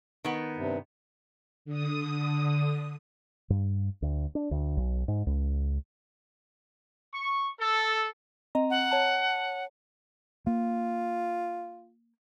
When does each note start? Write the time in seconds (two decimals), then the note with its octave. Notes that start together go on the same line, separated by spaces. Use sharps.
0.25 D#3 B3
0.57 G2 C3
1.65 D3 D#6
3.50 G2
4.02 D2
4.35 D4
4.51 D2
4.77 B1
5.08 G#2
5.27 C#2
7.14 C#6
7.60 A4
8.55 C4 D#5 A#5
8.70 F#5
8.91 C#5 A5
10.47 A#3 F4